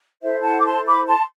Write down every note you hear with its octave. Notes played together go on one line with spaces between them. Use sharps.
E4 A4 C5 E5
F#5 A5
D6
A5 C6
B5 D6
A5 C6